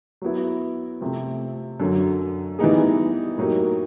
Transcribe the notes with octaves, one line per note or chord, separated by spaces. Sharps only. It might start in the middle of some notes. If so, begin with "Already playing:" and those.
F#3 B3 E4
C3 F3 A3 C4
F#2 D3 F#3
E3 G3 B3 D#4 G#4
A2 F#3 A#3 D#4 G4